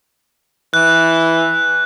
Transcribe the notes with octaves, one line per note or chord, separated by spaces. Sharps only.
E3 F#6